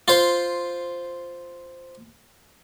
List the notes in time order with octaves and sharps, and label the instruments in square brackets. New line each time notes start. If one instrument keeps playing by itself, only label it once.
[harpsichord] F4 C5